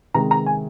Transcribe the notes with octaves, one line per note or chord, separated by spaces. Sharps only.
C3 D#3 G#3 A#5
A#5
G#5